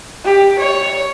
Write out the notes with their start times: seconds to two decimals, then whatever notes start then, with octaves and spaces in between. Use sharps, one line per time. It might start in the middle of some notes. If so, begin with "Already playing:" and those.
0.24 G4
0.59 C#5